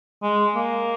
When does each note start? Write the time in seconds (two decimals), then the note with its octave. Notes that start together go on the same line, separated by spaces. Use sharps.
0.23 G#3
0.55 A#3